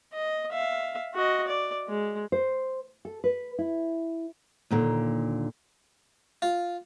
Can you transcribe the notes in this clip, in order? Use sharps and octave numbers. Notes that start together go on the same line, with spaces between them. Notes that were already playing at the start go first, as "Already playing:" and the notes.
D#5
E5 F5
F#4 D#5
D5
G#3
C5
A4
B4
E4
D#2 A#2 D3
F4